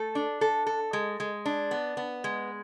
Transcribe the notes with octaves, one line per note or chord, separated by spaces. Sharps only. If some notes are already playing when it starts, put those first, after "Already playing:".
Already playing: A3 A4
D4
A4
A4
G#3
G#3
D4
B3
B3
G#3